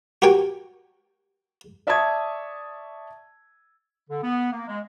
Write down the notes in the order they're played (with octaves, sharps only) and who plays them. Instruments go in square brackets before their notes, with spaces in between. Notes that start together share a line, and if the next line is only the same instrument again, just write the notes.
[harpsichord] F#4 G4 A#4 C#5 G5 G#5
[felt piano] D5 E5 A5 C#6 D#6 G#6
[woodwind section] D3
B3
A#3
G#3